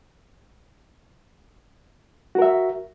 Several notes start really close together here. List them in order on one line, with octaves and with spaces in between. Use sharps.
F#4 A#4 E5